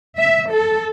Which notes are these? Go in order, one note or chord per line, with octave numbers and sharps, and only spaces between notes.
E5
A4